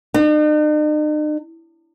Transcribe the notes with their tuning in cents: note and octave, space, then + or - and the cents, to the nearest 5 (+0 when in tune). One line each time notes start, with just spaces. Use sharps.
D#4 -45